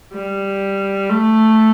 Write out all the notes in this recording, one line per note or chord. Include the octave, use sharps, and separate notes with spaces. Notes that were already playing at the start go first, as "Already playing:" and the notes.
G3
A3